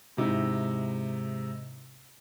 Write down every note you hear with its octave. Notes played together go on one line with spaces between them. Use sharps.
G#2 C3 D#4 E4